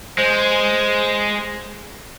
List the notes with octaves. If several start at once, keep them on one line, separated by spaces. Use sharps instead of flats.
G#3 C5